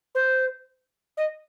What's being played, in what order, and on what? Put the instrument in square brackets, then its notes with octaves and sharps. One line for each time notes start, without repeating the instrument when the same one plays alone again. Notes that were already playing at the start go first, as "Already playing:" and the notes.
[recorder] C5
D#5